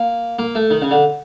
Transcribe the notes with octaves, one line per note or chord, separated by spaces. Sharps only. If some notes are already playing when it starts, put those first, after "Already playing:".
Already playing: A#3
A#3
A3
D#3
C#3
D3